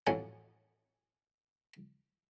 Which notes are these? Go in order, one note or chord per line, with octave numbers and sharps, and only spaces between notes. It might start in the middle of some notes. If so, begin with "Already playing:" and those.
A1 F2 A2 F#3 G#5